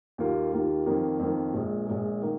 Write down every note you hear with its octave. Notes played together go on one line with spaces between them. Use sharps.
D#2 D#3 A#3 F4
D#2 D#3 A#3 F4
F2 D#3 A#3
F2 D#3 A#3
A#1 A#2 G#3
A#1 A#2 G#3
D#3 A#3